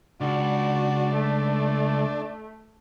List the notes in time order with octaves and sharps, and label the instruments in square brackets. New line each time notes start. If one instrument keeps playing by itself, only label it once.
[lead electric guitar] C#2 [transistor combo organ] D4 [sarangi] F#4
[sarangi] A3